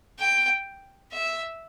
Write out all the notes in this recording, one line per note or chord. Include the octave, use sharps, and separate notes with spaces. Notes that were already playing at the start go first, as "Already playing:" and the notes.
G5
E5